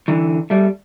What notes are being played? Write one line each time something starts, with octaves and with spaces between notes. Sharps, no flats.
D3 E3
G3 A3